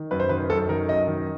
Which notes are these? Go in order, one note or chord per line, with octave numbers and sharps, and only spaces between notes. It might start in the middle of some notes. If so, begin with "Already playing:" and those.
Already playing: D#3
F#2 B4
C5
D#3 B4
F#2 A4
D#3 A#4
F#2 D#5
D#3